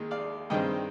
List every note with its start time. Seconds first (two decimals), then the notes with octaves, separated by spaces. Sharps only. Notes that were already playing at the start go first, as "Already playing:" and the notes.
Already playing: D#2 D#3 G#3
0.11 D5 F5
0.50 G2 D#3 G#3 C4 D#5 G5